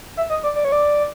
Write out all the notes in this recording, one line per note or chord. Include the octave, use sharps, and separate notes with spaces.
E5
D#5
D5
D5
C#5
D5